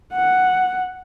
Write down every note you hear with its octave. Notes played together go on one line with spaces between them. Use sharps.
F#5